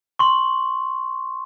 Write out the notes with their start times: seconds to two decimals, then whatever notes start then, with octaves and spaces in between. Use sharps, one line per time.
0.19 C6 C#6